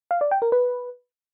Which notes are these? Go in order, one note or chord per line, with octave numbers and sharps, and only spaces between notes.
F5
D5
G5
A#4
B4